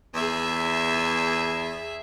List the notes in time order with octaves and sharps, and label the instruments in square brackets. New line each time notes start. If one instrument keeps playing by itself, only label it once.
[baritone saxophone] E2 [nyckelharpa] G#4 E5